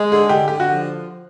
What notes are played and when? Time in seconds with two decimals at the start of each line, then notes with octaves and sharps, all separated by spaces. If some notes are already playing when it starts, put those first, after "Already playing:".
Already playing: G#3
0.11 D3 G#4
0.29 D3 G4
0.48 D3 G4
0.60 F#4
0.66 F3